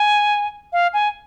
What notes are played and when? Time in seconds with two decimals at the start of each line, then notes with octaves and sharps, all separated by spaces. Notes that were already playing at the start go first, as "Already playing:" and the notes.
Already playing: G#5
0.73 F5
0.94 G#5